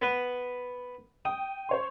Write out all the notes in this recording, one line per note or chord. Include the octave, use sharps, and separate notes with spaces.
B3 B4
G5 D#6
C5 C#5 C6